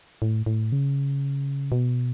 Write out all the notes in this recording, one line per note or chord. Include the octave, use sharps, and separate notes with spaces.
A2
A2
C#3
B2